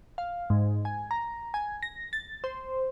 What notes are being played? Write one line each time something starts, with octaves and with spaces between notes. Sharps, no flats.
F5
G#2
G#5
A#5
G#5
A#6
A6
C5